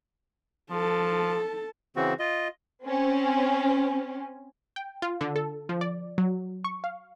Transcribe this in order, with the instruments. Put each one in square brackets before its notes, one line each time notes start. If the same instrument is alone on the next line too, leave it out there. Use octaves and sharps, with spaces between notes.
[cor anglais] F3 [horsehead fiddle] A4 A5
[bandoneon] C#3 E3 C4 F#4
F4 D#5
[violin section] C4 C#4
[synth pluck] G5
F4
D3
A4
F3
D5
F#3
C#6
F5